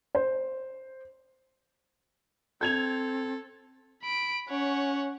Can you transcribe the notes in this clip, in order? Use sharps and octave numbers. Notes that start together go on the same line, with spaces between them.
C5
C4 A4 G6 G#6 F7
B5 D7
C#4 C#5 F#5